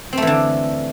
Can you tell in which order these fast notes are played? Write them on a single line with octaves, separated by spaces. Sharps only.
C4 A3 E3 D3